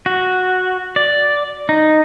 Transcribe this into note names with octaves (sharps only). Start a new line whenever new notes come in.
F#4
D5
D#4